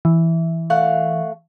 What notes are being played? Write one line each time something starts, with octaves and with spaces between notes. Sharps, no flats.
E3
A3 F5 F#5